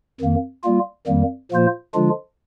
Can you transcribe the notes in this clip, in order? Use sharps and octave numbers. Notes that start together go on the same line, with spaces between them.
F2 D#3 A#3
G3 A#3 F4
F2 D#3 G3 A#3
A#2 F3 A#3 F4 C5
D3 F3 G#3 D4 F4